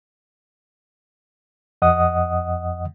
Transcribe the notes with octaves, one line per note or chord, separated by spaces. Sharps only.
F2 D#5 F#5 D#6